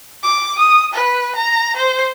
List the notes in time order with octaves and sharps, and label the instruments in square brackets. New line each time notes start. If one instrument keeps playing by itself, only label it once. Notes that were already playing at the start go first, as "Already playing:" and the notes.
[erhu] D6
D#6
B4
A#5
C5